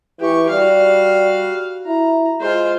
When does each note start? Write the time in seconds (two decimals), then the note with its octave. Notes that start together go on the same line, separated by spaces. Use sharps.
0.20 E3 G4 C#6
0.50 G3 F#4 F5
1.86 E4 A#5
2.41 G#3 F4 C5